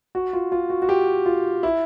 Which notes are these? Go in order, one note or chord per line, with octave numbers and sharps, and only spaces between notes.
F#4
F4
F4
F#4
F#4
G4
F4
E4